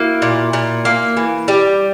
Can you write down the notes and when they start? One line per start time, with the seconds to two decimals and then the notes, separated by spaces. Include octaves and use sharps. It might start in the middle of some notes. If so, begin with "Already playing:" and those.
Already playing: A#3 E4 F#4
0.22 A#2
0.53 A#2
0.85 A#3
1.17 E3
1.48 G3